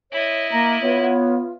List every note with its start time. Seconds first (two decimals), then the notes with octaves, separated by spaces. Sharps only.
0.12 E4 C#5 D#5
0.52 A#3 A#5
0.82 B3 F4 C#5